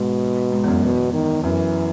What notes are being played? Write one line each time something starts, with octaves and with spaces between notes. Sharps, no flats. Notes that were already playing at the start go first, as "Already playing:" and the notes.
Already playing: G#2 B2
G#2
E2
F#2
E2 B2
D#3
F#2 E3